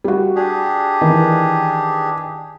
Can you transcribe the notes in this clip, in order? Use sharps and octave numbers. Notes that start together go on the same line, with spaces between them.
G3 F#4
D4 G4 G#4
D#3 E3